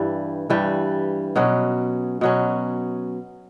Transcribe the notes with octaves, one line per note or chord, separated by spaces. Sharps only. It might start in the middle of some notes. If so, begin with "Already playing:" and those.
Already playing: G2 E3 G3
G2 E3 G3
B2 F#3 C#4
B2 F#3 C#4